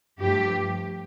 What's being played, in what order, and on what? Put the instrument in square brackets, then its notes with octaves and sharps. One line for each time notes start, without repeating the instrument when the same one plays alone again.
[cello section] G2 F3 A3 G4